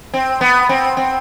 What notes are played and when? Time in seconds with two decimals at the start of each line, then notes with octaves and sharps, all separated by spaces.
0.14 C4
0.41 B3
0.69 C4
0.97 C4